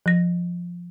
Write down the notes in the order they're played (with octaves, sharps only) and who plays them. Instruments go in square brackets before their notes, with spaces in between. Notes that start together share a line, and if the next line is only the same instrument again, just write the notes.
[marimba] F3 A#6